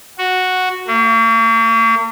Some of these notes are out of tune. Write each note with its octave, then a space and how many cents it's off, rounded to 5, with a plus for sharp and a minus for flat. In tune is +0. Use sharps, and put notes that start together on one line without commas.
F#4 -5
A#3 -45